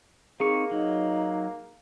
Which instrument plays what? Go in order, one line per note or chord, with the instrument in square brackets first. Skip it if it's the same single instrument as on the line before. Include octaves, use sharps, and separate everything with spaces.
[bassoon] A#3 [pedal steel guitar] C4 D#4 C#6 [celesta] G#4
[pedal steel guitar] F#3 [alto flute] D#4